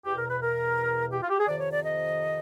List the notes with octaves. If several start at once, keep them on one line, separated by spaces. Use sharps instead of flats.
E2 B2 G4
A#4
B4
A#4
G4
F4
G4
G#4
F2 C3 D#3 D5
C#5
D5
D#5